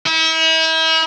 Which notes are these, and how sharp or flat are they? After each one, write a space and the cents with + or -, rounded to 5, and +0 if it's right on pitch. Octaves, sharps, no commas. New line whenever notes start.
E4 -40